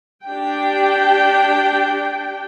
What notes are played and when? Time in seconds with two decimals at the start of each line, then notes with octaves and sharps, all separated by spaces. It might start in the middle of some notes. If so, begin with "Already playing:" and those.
0.24 D4 G4 G5